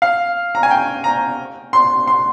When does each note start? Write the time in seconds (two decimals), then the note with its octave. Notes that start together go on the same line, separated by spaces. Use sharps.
0.02 F5
0.55 A#5
0.63 G#5
0.71 G5
1.04 A#5
1.73 C6
2.07 C6